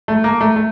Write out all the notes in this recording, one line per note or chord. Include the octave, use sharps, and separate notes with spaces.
A3
A#3
A3
A3